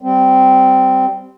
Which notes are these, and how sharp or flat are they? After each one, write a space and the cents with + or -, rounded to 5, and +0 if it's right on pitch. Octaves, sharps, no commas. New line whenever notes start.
G3 -10 C4 -15